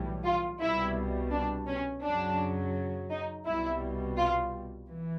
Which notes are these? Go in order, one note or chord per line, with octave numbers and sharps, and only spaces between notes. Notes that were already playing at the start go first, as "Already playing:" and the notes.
Already playing: B1 A2 E3 G3
F4
C2 B2 G3 E4
D4
C#4
F#2 C#3 F#3 D4
D#4
C2 B2 G3 E4
F4
E3